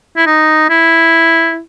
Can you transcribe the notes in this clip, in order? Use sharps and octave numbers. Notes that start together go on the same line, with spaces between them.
E4
D#4
E4